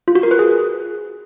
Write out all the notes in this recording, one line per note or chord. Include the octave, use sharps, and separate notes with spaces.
F4
F#4
A#4
B4
G#4